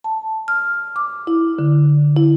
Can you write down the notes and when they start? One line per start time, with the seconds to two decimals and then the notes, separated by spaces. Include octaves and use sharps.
0.04 A5
0.48 F6
0.96 D6
1.27 E4
1.59 D3
2.16 E4